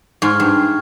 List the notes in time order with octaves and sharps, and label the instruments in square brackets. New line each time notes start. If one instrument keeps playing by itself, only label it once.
[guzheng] G#2 [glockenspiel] C#6 F6 G#6
[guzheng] G2